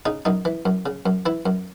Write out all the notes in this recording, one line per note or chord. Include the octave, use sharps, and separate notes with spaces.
C#3 D#4
F#2 D#4
E3
F#2
C#3
F#2
E3 E4
F#2